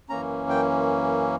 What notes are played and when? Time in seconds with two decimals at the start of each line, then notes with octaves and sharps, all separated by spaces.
0.09 F#2 E3 A#3 C#4 A#5
0.50 G5